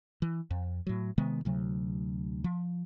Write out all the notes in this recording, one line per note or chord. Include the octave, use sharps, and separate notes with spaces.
E3
F2
A2 F#3
C3 D#3 G#3 B3
D2 C3 F#3
F3